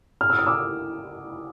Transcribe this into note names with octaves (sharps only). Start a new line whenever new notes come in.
F6
E6
D#6
D6 E6